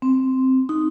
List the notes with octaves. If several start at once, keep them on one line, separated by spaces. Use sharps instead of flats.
C4
D#4